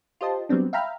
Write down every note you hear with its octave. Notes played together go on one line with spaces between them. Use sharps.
F4 G4 C5 D#5 A5
F#3 G3 B3 C4 D4
E5 F5 G5 A#5 B5 F6